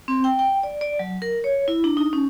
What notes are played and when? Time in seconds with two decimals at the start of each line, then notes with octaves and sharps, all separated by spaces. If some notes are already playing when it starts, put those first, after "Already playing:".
0.08 C4
0.24 G5
0.39 G5
0.63 D5
0.81 D5
0.99 F#3
1.22 A#4
1.44 C#5
1.68 E4
1.84 D4
1.97 D#4
2.13 C#4